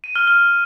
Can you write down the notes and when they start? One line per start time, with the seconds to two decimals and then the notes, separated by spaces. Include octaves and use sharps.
0.04 D#7
0.16 F6
0.27 F6